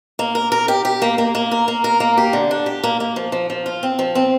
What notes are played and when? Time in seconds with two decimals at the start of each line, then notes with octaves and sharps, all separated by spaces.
0.19 A#3
0.35 A#4
0.52 A#4
0.68 G4
0.85 G4
1.02 A#3
1.18 A#3
1.35 A#3
1.51 A#4
1.68 A#3
1.84 A#4
2.00 A#3
2.18 G4
2.33 D3
2.51 D4
2.66 G4
2.83 A#3
3.00 A#3
3.16 F3
3.32 F3
3.50 F3
3.66 F4
3.83 C4
3.99 F3
4.15 C4